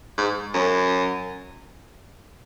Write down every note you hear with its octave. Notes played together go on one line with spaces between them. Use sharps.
G#2
F#2